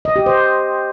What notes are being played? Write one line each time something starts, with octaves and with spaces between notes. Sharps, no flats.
D#5
G4
C5